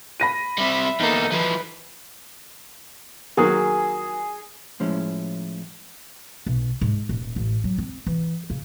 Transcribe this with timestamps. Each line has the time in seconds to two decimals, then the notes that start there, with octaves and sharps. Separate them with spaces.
0.20 B5 A#6 D#7
0.58 C3 G3 E5
1.00 E2 A#3 D#4 A4
1.32 E3 F3 B4
3.37 D#3 F#3 A#3 G#4
4.80 A2 F3 G#3 C#4 E4
6.46 B1
6.81 G#2
7.09 D#1
7.36 A1
7.64 F#3
7.78 C4
8.07 E3
8.50 C#3